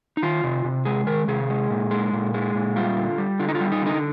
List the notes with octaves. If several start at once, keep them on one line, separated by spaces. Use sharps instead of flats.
D#4
D#3 F4
C3
C3
G#3 G#4
D#3 A#4
C3 G#4
G#3
A#2
G#3
A#2
G#3
A#2
G3 F4
D3
G3
D3 F4
D#4
F4
G3
D#4
D3 D#4